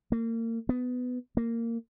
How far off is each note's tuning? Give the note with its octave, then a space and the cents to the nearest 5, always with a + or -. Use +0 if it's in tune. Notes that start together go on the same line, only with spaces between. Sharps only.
A#3 -35
B3 +15
A#3 -15